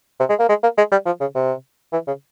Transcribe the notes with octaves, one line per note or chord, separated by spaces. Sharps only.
C3
G#3
A#3
G#3
A#3
G#3
G3
F3
C#3
C3
E3
C#3